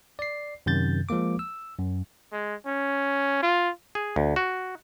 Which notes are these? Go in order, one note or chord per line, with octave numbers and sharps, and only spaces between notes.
D5 C7
F#2 C3 D#3 G6 A6
F3 G#3 A#3 D6
E6
F#2
G#3
C#4
F4
G#4
D2
F#4